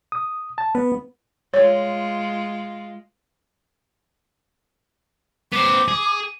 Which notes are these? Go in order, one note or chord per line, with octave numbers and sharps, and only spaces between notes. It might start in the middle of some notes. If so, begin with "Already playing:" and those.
D#6
A5
B3 B4
G#3 F4 C#5
B3 C5 D6
G#4